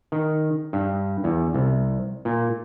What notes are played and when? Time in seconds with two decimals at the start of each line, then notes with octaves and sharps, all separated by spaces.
0.12 D#3
0.73 G2
1.24 E2
1.54 C2
2.25 A#2